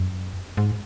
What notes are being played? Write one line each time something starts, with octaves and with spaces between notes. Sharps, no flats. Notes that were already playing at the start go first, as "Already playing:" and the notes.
Already playing: F#2
G#2